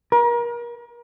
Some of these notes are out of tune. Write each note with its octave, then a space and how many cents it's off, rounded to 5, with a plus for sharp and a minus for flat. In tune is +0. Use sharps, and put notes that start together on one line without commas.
A#4 +35